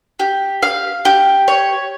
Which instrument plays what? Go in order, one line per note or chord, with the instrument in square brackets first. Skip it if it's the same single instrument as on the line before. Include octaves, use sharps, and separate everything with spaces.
[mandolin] G4
F5
G4
C#5